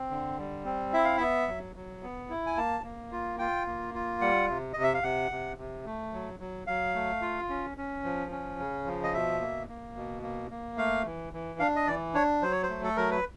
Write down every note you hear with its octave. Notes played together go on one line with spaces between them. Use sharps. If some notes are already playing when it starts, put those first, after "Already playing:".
Already playing: C4
D3
G3
C4
E4 E5
F5
B3 E5
F#3
F#3
B3
E4
G#5
A#3 A5
A#3
F4
F4 G5
A#3
F4
G3 F#5
C3
C3 D#5
E5
F5
C3 F#5
C3
C3
A3
F#3
F#3
F#3 F5
A3
F4
C#4
C#4
F3
C#4
C#3
F3
D#5
B2 E5
A#3
A#3
B2
A#3
A#3
A3 F5
E3
E3
D4 F5
D#5
E3 D5
D4 C#5
F#3 C5
C#5
C5
A3
A4
F#3 A#4
B4